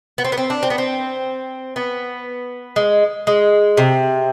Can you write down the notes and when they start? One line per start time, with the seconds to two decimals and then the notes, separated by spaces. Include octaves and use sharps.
0.18 B3
0.24 C4
0.32 B3
0.37 C4
0.50 D4
0.63 C4
0.70 B3
0.78 C4
1.76 B3
2.76 G#3
3.27 G#3
3.77 C3